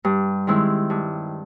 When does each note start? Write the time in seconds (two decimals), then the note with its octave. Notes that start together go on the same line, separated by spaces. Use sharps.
0.05 G2
0.47 D#3 G#3 C4 E4
0.90 G2